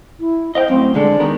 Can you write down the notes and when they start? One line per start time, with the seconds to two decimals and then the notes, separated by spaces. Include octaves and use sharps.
0.20 E4
0.55 C5 D#5 F5 G5
0.69 F#2 A2 C4
0.95 D3 G#3 A4 D5
1.20 D#3 B3 A#4